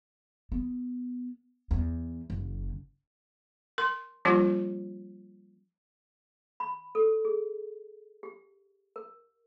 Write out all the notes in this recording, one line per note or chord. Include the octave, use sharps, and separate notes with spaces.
B3
E2
F#1
A#4 C6
F3 G3 A#3 C#4 F4 G4
B5
A4
G#4
G4
A#4